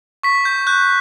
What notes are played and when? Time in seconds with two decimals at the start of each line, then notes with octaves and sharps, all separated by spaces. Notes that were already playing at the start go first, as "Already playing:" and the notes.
0.23 C#6 B6
0.45 G6
0.67 F#6 G6